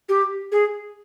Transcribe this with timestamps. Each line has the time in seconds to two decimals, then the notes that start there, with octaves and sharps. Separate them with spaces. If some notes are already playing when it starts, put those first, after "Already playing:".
0.08 G4
0.51 G#4